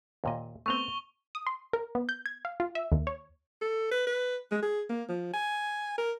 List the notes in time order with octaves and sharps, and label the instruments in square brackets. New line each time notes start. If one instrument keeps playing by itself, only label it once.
[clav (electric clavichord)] D#2 A#2 D#5
[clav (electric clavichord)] A3 B3 C4 [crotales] C#6 F7 G7
[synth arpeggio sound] D#6
C6
A#4
B3
G6
G#6
F5
F4
E5
D#2
C#5
[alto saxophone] A4
B4
B4
G#3
G#4
A#3
F3
G#5
A#4